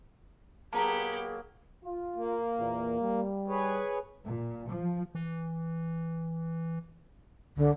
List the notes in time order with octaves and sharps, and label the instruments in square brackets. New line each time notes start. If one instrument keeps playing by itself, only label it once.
[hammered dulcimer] F#3 A#3 [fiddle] B3 G4 [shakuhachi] G#4 [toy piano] A5 A#5
[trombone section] F4
[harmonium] A#3
[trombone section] E2 A#2
G3
[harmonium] G#4 B4 C#5
[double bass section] A#2
F3
[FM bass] E3
[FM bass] C2 [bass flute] D3